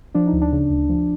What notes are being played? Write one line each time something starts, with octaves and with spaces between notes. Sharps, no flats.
F3 D4
D#4
D2
D4
C#3
D2
F3